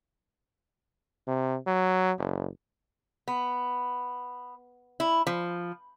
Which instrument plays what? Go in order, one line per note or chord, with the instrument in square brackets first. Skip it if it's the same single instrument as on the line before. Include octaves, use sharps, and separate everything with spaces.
[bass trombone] C3
F#3
F#1
[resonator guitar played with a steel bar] B3
E4
F3